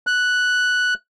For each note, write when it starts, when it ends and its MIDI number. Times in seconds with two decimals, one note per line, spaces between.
0.07 0.94 90